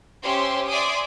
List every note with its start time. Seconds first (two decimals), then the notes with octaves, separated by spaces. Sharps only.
0.22 C#4 G4 C5 E5 C6
0.68 D5 E5 G#5 C6 D6 D#6